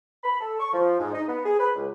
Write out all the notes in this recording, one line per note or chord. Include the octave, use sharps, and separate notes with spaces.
B5
A4
C#6
F3
G#2
D#4
B3
G#4
B4
C#2